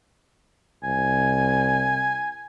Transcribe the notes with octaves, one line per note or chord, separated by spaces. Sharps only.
C2 G#5